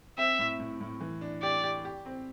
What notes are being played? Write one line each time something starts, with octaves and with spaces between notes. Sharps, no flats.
C4 E5
A2
A2
A2
E3
D4
G4 D5
G4
G4
C4